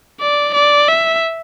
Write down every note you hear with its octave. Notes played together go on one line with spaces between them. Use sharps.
D5
D5
E5